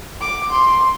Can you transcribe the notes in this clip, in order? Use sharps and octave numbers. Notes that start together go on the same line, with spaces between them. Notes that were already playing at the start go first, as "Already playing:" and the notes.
D6
C6